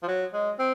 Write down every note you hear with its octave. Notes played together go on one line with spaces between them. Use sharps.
F3
F#3
G#3
C4